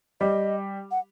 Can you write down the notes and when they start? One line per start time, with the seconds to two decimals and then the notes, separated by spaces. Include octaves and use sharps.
0.20 G3 G4 D#5
0.91 F#5